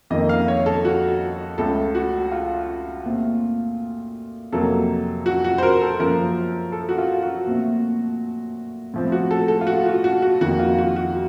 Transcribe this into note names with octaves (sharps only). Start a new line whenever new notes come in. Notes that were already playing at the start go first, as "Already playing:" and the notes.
F2 D#3 A#3 D#5
F5
C#5
A4
F#4
C#2 C#3 A3 A4
F#4
F4
A#2 A3 C4
F2 C3 F#3 A#3 A4
F#4
F#4
C5
A#4
A4
F#2 F3 A#3 A#4
A4
F#4
F4
F#4
A#2 A3 C4
A2 F3 C4
F#4
A4
A4
F4
F#4
F#4
F#4
F#4
F2 D#3 A#3 F#4
F4
F#4
F#4